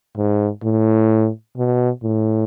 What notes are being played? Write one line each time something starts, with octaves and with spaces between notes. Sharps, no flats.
G#2
A2
B2
A2